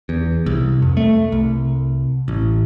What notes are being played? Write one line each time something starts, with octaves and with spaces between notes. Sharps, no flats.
E2
C2
F2
A3
C2
A1